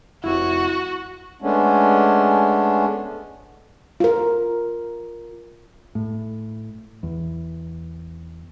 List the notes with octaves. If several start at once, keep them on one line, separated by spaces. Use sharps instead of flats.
F1 E4 F#4
G#3 A3 B3 C#4 D4
F4 A#4
A2
E2